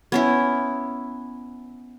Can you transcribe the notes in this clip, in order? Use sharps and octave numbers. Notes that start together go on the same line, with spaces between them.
B3 C#4 E4